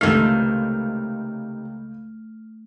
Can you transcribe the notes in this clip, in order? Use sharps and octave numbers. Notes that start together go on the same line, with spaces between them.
C#2 C3 D#3 A3 A4 F6